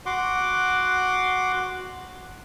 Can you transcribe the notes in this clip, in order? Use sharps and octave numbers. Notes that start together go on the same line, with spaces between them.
F#4 F#5 C6 D6